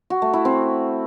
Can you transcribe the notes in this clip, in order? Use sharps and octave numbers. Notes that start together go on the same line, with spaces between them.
F#4
A3
E4
C4